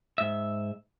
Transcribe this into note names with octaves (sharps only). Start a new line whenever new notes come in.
G#2 E5